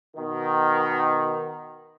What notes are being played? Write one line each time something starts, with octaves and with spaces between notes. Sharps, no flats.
B2 D#3